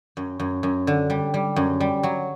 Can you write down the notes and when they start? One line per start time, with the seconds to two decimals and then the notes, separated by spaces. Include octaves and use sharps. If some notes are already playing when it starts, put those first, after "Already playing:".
0.17 F#2
0.40 F#2
0.63 F#2
0.87 D3
1.10 G3
1.34 G3
1.56 F#2
1.80 G3
2.03 F#3